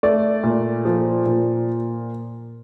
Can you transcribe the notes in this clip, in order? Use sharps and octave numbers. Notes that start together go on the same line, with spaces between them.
A3 D5
A#2
F3
A#2